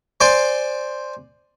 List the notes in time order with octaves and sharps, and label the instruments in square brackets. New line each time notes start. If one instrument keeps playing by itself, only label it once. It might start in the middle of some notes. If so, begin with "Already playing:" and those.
[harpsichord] C5 D5 G#5 C6